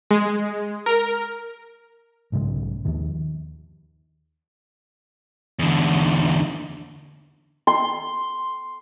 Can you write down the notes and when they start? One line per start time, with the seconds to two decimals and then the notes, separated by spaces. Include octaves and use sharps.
0.11 G#3
0.86 A#4
2.32 B1 G#2 C#3 G#3
2.85 D#2 D#3 F3
5.59 E2 D3
7.67 C6